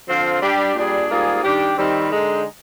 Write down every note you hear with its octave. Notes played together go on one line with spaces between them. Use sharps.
D3 F3 C4 F4
G3 D4 G4
A#2 G3 D4 G#4
G#2 G3 A#3 F4 G#4
D#3 G3 D4 G4
D#3 G3 C4
D3 G#3 D#4